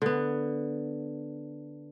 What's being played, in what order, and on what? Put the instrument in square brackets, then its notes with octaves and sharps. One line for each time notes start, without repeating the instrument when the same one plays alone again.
[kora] D3 B3